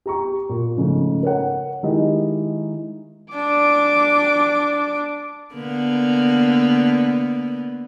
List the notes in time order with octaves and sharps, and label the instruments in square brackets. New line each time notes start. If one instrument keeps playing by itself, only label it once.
[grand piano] G4 A#5 C#6
A#2
G#2 C#3 F3 A3
A#4 C#5 F#5
D#3 G#3 E4 G4 D#5
[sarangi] D4 [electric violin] D6
[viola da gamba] D3 A#3 B3